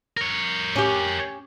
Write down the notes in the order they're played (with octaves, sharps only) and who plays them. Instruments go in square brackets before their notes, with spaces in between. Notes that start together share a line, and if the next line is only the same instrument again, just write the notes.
[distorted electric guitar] A#4 C#5
[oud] C#4 G4